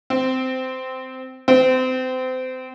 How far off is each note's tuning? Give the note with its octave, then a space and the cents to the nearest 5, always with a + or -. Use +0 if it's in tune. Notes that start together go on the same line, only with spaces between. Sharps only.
C4 -15
C4 -30